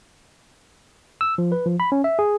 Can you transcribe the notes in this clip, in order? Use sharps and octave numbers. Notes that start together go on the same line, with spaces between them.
E6
F3
B4
F3
B5
C#4
E5
G#4